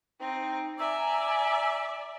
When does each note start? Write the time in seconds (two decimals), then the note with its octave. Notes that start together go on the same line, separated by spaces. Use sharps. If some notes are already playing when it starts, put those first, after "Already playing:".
0.20 C4 D#4
0.79 D5 E5 G#5 A#5 E6